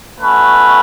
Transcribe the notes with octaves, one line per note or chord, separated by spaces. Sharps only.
A3 C#4 F#4 B4